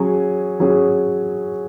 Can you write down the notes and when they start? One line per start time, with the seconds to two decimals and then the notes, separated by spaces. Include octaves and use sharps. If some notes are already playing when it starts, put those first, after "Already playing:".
Already playing: F#3 C#4 G#4
0.60 F#3 C#4 G#4